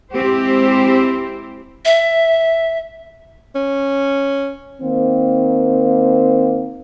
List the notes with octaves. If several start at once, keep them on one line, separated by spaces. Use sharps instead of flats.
G#3 C4 E4 G4 C5
E5
C#4
D#3 A#3 C4